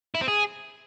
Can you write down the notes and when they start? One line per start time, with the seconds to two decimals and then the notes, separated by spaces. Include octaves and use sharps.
0.15 E4
0.21 C4
0.28 G#4